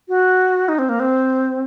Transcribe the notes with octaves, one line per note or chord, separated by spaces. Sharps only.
F#4
D#4
C4
A#3
C4